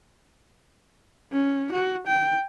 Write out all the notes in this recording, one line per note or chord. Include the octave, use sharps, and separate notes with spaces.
C#4
F#4
G5